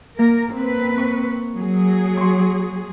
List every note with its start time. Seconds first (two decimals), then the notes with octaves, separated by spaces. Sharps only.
0.19 A#3 A#4
0.54 C4 B4
0.98 C#6
1.57 F#3 G#4
2.17 C6 C#6